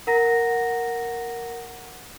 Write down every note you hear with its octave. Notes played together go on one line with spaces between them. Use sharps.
A#4 F#5 A#5 A#6